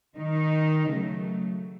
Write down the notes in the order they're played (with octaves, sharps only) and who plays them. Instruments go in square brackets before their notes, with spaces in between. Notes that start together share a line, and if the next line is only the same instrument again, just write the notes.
[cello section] D#3 D#4
C#3 F#3 A3